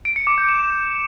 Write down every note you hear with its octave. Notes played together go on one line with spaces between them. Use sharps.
D7
C#7
D6
G6
E7